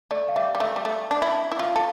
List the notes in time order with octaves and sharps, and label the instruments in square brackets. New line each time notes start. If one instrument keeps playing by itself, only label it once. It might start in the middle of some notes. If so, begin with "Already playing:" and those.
[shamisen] A3 [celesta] D5
[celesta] F5
[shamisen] G3 [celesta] E5
[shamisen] G3
[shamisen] A3 [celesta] E5
[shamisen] G3
A3
D4
E4
E4
[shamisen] F4 [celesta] F5
[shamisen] A4